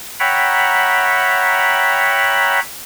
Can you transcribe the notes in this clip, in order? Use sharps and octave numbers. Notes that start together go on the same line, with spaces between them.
C#5 E5 F#5 G5 A#5 B5